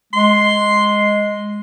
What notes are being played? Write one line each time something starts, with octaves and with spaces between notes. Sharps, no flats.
G#3 C6